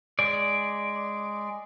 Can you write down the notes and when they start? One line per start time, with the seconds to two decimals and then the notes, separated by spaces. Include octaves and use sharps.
0.19 G#3 D5